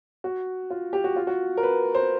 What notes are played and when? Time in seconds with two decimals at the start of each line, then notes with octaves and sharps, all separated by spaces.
0.24 F#4
0.70 F4
0.93 G4
1.04 F#4
1.16 F4
1.27 F#4
1.57 A#4
1.63 B4
1.95 C5